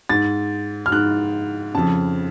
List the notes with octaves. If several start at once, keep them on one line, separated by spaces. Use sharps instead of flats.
G#2 A6
F6
G#2 F#6
F2 C#3 A5